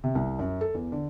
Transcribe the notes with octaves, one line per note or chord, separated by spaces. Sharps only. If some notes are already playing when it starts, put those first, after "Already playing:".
C3
C2
F#2
A4
E2
D3